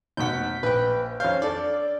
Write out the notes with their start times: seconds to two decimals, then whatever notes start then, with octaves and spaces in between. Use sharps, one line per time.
0.17 F1 B2 F#5 G6 B6
0.63 A#1 B4 G5
1.20 F2 C#4 F5 G6
1.42 D4 A4 D5